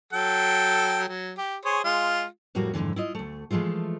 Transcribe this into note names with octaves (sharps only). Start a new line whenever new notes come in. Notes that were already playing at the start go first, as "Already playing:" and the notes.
F#3 A4 G5
F#3
G4
G#4 C5 C#5
G#3 F4
F2 A2 G3 A#3 F#4
F2 G#2 B2 D3 E3
E4 F4 D#5
D2 A3
E3 F3 G#3 A3 F4